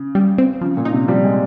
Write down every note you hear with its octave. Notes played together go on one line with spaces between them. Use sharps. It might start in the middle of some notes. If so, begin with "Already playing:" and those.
Already playing: C#3
G3
C4
C#3 F3
A#2
D#4
C3
F3 G3
G#3